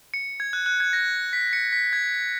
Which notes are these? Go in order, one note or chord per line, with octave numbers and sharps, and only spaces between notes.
C#7
G#6
F#6
F#6
G#6
A#6
B6
C#7
B6
G#6